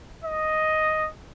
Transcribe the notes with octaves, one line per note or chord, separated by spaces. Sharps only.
D#5